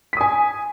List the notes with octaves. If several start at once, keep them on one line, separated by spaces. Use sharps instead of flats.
G#5 D#6 B6